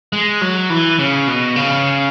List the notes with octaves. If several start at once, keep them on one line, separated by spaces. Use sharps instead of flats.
G#3
F#3
E3
C#3
B2
C#3